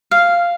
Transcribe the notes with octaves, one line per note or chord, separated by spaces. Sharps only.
F5